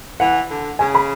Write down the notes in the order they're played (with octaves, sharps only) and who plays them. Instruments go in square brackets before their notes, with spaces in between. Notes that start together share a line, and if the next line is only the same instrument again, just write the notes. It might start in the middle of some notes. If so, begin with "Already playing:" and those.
[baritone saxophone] E3 [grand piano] F#5
[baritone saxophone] D3
[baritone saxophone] C#3 [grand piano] G#5
[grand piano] B5